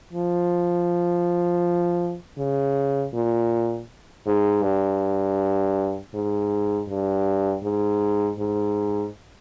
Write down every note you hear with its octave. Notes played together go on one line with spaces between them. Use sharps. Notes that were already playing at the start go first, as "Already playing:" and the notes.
F3
C#3
A#2
G#2
G2
G#2
G2
G#2
G#2